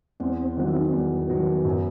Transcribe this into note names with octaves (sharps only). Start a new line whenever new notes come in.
E2 C4
D#3 F#3 F#4
E4
D#4
C4
E2 B3
D#3 F#3
F#2